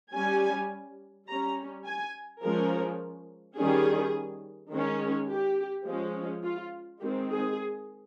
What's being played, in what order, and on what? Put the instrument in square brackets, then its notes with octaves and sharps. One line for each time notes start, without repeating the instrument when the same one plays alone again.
[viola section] G3 C#4 G#5
G3 C#4 A#5
G#5
F3 G#3 C#4 A#4
D#3 G3 C#4 G#4
D#3 G#3 C#4
G4
F3 G#3 C#4
F4
D#3 G#3 C4 G4
G#4